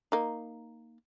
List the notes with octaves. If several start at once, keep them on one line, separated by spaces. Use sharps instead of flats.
A#3 D#4